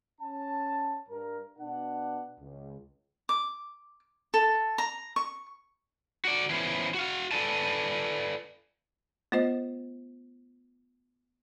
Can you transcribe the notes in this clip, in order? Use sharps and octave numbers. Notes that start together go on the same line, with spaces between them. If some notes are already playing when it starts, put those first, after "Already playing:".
C#4 A5
G2 A#4
B2 D4 F#5
C#2
D6
A4
A#5
C#6
F#4 D5
E3 F3 B3 C#4 E4 C5
F#4 F5
A4 B4 D5 G#5 A5
A3 B3 F4 C5 D#5